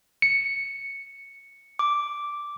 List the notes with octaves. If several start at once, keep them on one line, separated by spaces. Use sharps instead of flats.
C#7
D6